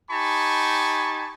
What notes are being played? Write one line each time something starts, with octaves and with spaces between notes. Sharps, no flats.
D#4 G4 G#5 A5 B5 C#6